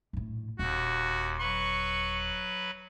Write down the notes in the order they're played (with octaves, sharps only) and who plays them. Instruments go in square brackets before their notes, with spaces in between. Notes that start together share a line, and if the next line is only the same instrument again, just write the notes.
[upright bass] A#1 A2
[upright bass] D#1 [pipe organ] D#2 [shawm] F#4
[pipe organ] F#3 B4 B5 [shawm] C#6